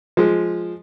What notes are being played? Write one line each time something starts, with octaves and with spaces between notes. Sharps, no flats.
F3 G#3